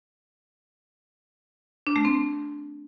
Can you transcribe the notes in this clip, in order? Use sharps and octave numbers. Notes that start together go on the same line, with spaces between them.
D4
A3
C4